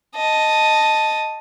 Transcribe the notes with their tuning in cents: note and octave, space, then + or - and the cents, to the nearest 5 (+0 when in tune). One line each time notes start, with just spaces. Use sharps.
D#5 +0 A5 +0